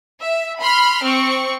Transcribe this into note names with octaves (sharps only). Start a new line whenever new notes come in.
E5
B5 C6 F6
C4 C#6